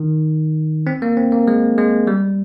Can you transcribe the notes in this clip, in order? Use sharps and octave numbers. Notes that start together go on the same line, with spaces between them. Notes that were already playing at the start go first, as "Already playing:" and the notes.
Already playing: D#3
C4
A#3
C4
A#3
G#3
G#3
G3